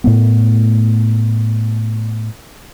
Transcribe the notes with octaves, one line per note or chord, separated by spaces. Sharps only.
A2 A3 B3